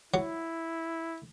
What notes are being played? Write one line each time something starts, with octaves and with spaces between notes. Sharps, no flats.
F#3 E4